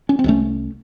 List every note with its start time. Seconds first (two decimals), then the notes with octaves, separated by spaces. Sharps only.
0.09 C#4
0.19 C4
0.24 C2 C3 A3 C#4